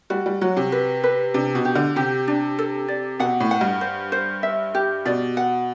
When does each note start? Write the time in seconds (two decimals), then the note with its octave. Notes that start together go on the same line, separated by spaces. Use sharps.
0.10 G3 F#4
0.26 G3
0.41 F#3 F#4
0.57 C3
0.72 B4
1.04 B4
1.34 C3 D4
1.55 B2
1.65 G4
1.75 D3
1.96 C3 G4
2.28 D4
2.59 A4
2.88 D5
3.20 B2 F#5
3.40 A2
3.51 F#5
3.61 G2
3.81 C5
4.12 C5
4.43 E5
4.75 G4
5.05 B2 D5
5.37 F#5